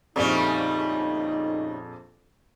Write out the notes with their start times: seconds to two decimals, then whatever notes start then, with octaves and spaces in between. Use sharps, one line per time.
0.16 A#1 F2 C#3 G3 A3 D#4